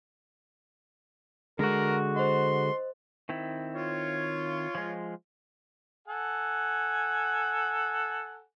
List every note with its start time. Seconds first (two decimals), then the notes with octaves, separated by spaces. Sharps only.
1.59 D3 G#3 F#4 A#4
2.16 C5 D#5 C6
3.29 D#3 C4 E4
3.74 F4 C#5
4.75 F3 G#3
6.08 A4 F#5 G#5